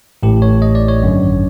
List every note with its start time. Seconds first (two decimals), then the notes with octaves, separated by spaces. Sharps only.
0.23 A1 A2 E3 G4
0.42 C#5
0.62 D#5
0.75 D5
0.88 C#5
1.01 G#1 F#2 D3